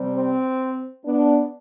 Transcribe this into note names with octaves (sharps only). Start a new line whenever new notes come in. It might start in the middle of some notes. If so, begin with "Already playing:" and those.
Already playing: C3 G3
C4
B3 D4